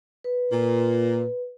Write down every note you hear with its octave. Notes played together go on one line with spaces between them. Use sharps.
B4
A#2